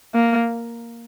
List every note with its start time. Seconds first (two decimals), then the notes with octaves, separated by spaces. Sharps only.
0.15 A#3